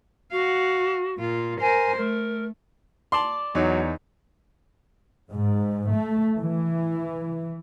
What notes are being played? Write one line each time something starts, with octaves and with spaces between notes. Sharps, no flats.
F#4 F5 F#5
A#2 F4
A#4 C5 G#5
A3 A#4
D5 A5 C6
E2 F#3 D#4 C#5
G#2
A3
E3